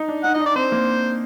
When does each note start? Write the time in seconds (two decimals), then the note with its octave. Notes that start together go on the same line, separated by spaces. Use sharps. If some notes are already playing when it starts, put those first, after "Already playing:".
Already playing: D#4
0.08 D4
0.24 D#4 F#5
0.34 D#4 D#5
0.40 D4
0.46 D5
0.55 C4 C5
0.72 A#3